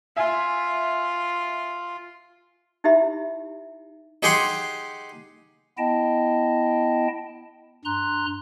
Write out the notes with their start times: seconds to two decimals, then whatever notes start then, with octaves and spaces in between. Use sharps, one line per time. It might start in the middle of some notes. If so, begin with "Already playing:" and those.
0.17 F4 E5 G#5
2.84 D#4 E4 G4 E5 B5
4.23 D#4 G4 G#4 F#5 C6
5.78 B3 E4 D#5 G5 A5
7.85 G2 A#5 C6 F#6